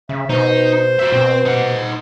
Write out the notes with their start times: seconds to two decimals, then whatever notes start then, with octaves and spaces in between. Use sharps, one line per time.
0.09 C#3 E5
0.29 B2 D#4 C5
0.99 F#4 E5
1.12 B2 C4
1.45 D#4 F#5